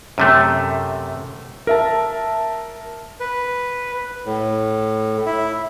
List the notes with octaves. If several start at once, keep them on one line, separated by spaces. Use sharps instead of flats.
F#2 C3 A3
A#4 E5 A5
B4
A2
E4